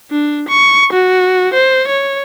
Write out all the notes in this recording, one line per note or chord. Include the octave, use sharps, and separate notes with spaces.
D4
C#6
F#4
C5
C#5